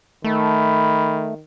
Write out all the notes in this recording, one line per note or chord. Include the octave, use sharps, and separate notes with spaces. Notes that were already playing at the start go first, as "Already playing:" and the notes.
D#3 A3 B5